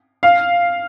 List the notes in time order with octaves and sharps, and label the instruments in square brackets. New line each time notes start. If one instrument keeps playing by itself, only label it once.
[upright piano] F5